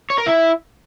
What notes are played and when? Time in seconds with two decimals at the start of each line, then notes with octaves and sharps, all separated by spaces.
0.10 C#5
0.18 A#4
0.26 E4